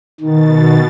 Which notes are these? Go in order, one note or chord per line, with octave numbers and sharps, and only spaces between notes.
B2 D#3 A6